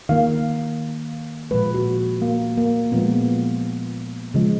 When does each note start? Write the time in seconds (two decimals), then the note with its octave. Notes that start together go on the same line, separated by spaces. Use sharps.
0.09 D#3 A#3 F5
1.51 A#2 F3 G#3 B4
1.74 F#4
2.22 A#3
2.58 A#3
2.92 A#2 F3 G#3 B3
4.34 C#3 F3 G#3